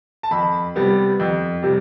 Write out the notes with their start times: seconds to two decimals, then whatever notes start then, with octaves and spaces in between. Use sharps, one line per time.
0.23 A5
0.31 F2 B5
0.75 C3 G3 B3
1.20 F2
1.63 C3 G3